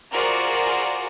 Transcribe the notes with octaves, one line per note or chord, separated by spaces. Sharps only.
F4 F#4 G#4 A#4 C5 D5